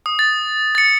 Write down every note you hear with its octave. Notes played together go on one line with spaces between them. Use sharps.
D#6
A6
A6 C#7